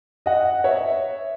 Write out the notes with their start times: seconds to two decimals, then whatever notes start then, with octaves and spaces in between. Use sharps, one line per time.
0.26 D#5 F#5
0.64 C#5 E5